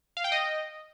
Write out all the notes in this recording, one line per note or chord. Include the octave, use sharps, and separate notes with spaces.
F5
G5
D#5